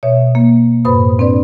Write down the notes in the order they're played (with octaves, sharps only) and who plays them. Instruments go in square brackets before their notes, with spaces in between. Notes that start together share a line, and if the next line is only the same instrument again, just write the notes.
[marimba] B2 C#5 E5
A#3
F#2 A2 B4 C5 B5 D#6
C4 D4 B4 D5